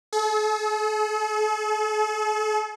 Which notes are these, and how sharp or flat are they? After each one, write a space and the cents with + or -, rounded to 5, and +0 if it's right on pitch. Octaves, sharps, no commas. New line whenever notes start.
A4 -45